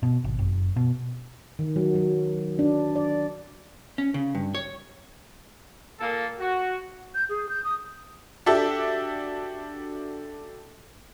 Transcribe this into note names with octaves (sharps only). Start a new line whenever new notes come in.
B2
G#1
F#1
B2
D#3
F#3
F#3
D4
D5
C#4
C#3
G2
C#5
A#2 A#3 A4
F#4
G6
G#4
G6
D#6
D4 F#4 G4 A4 E5